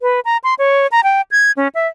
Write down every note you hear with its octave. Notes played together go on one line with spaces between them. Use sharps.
B4
A#5
C6
C#5
A#5
G5
G#6
C#4
E5